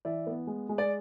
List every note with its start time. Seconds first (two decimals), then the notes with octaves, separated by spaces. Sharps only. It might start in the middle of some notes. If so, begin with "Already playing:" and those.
0.05 E3 D5 E5
0.27 B3
0.47 G#3
0.69 G#3
0.78 D5